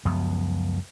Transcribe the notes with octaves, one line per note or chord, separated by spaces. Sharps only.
C#2 F#2 F3 B3